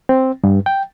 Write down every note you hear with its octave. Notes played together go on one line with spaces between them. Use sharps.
C4
G2
G5